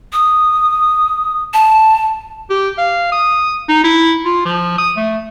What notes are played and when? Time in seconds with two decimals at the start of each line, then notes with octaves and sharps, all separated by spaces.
0.13 D#6
1.53 A5
2.50 G4
2.78 F5
3.12 D#6
3.69 D#4
3.84 E4
4.25 F4
4.45 F3
4.78 D#6
4.97 A3